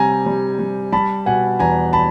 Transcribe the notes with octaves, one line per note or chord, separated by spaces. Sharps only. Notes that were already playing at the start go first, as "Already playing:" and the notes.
Already playing: C3 G3 G#5 A#5
G3
G3
G3 A5 B5
B2 F#5 G#5
E2 G#5 A#5
A5 B5